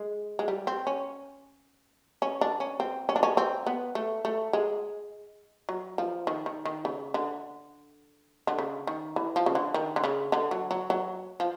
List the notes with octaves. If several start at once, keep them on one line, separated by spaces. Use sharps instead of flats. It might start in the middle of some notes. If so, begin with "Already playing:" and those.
Already playing: G#3
G#3
G3
C4
C#4
C#4
D4
C#4
C4
C#4
D4
C#4
C4
B3
A3
A3
G#3
F#3
F3
D#3
D#3
D#3
C#3
D3
D3
C#3
D#3
E3
F3
C#3
D3
D#3
D3
C#3
D3
F#3
F#3
F#3
F3